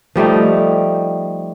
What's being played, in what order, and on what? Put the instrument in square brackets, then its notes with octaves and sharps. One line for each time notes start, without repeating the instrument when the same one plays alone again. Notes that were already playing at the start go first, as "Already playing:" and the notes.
[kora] F3 G3 A3 D#4